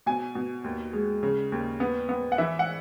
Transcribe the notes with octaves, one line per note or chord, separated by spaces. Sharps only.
B2 G#5
B2
D#2
G#3
C#3
D#2
B3
B3
F#5
E3 E5
F#5